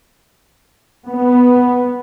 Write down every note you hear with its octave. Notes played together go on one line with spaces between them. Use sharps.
B3